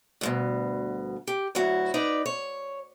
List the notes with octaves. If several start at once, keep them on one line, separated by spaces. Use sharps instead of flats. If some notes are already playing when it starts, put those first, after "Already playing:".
D2 G2 B2
G4
D2 F#3 E4 F#4
D#4 B4 D5
C#5